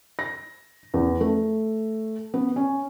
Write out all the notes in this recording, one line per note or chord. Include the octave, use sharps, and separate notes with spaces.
A#6
E2
A3
B3
C#4